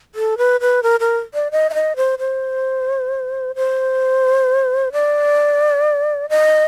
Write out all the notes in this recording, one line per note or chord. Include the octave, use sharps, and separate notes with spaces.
A4
B4
B4
A#4
A#4
D5
D#5
E5
D#5
C5
C5
C5
D5
D#5